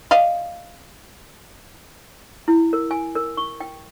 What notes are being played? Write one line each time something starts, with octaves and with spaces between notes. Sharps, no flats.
D5 D#5 F5
E4
A#4
G#5
A#4
C#6
G5